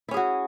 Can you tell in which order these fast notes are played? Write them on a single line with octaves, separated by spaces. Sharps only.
E4 C#4 G#4 F#4